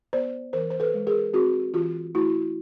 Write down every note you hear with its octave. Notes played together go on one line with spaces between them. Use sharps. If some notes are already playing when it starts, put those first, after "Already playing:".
B3 C5 D5
E3 A#4 C5
C5
A4 B4
G#3
G#4 A#4
C4 F#4 G#4
E3 F4 G4
A3 E4 F#4